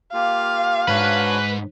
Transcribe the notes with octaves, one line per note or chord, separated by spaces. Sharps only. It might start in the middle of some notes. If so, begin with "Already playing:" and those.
A#3 F4 G4 F5
G#2 D4 F#4 B4 C#5